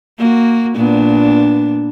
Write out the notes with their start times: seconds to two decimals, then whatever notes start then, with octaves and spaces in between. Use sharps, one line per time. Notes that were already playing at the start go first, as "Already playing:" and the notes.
0.18 A#3 F#4
0.76 A#2 B3 D4